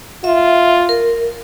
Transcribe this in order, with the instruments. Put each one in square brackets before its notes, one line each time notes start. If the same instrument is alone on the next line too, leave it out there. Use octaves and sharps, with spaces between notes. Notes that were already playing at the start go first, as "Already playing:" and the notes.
[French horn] F4 [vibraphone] E5
[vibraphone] A#4